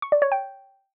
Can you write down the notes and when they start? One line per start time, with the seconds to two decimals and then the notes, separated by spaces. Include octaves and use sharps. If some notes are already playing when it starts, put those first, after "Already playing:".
0.02 C#6
0.12 D5
0.22 C#5
0.32 G5